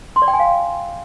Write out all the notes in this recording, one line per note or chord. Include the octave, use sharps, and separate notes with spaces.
C6
D5
G5
G#5
F5